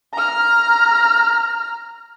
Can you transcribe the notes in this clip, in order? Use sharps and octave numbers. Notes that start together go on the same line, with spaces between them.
A#5 F6